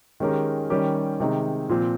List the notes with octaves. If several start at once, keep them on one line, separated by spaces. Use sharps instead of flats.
D#3 G#3 C#4 G4 A#4
D#3 G3 C#4 G4 A#4
C3 D#3 G#3 D#4
A#2 F3 C4